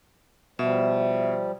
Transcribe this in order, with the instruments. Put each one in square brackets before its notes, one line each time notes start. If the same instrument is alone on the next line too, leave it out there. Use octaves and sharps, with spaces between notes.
[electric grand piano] B2 [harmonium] F3 G3 [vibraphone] E5